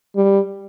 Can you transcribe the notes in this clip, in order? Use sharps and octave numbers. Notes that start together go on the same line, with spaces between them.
G3